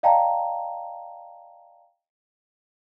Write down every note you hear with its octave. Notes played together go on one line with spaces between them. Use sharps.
D5 D#5 F5 G5 A5 A#5